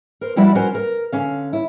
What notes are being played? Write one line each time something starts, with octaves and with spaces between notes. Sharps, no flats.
A#4 C5
F3 G3 E4 F#4 D5 E5
C#4 F#4 A#4 C5
A#4
D3 C#4 F5
E4